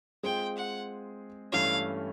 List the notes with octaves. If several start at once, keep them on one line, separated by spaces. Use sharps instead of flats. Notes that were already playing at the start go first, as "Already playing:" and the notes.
G#3 C4 F4 G#4 G5
F#5
G2 E3 A3 C#4 E4 F5